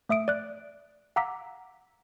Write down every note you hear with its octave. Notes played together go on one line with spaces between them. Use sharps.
A3 E5 D#6 D7
D5 F#6
F5 F#5 A#5 D6 E6 B6